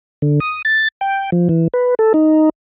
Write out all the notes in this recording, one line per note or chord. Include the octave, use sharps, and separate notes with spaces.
D3
D#6
A6
G5
F3
E3
B4
A4
D#4